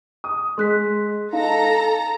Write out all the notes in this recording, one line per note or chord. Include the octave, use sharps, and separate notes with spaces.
D#6
G#3 C6 F#6 B6
D#4 A4 F5 A#5